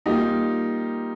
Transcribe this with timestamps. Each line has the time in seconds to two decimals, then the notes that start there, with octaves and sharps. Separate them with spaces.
0.06 G3 A#3 D#4 F4 G4